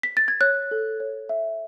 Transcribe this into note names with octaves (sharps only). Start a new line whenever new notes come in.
B6
A6
G#6
C#5 F#6
A4
C#5
E5